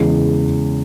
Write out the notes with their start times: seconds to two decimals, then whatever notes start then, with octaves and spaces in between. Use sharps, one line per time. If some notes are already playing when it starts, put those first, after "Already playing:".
Already playing: E2 C#3 G#3